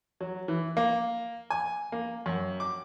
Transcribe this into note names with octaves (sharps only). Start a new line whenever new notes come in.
F#3
E3
A#3
G#5
A#3
F#2
D6